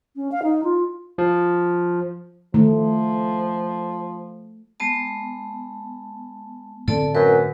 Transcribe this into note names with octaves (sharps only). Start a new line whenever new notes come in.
C#4
F5
D#4
F4
F3
D#3 F3 A3
G#3 B3 A5
A2 D3 C4 A4 D5 A5
F#2 B4